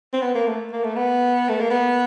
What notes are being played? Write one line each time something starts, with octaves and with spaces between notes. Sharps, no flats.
C4
B3
A#3
A3
A#3
A3
B3
A3
A#3
B3